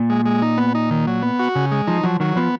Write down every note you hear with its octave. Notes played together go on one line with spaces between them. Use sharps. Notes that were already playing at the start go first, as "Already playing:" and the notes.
Already playing: A#2
G#3
G#3
D#4
B3
D#4
D#3
F#3
B3
F#4
C#3
G#3
F3 D#4
F3 F#3
D#3 F#3
F3 B3